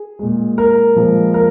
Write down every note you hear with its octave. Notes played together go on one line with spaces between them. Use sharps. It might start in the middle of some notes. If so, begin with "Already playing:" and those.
Already playing: G#4
A#2 G#3
A#4
A#2 F3 G#3
A#4